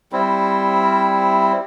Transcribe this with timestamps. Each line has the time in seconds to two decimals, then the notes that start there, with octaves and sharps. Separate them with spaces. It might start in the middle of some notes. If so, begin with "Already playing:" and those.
0.12 G3 C4 E4